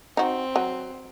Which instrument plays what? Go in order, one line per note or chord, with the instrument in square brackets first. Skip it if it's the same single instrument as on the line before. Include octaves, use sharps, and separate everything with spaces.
[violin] C4 [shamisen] D#4 F#4
[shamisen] F#3